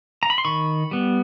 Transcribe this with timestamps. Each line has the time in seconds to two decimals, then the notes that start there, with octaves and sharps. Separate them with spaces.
0.23 A#5
0.30 B5
0.38 C6
0.45 D#3 B5 C#6
0.91 G3 B3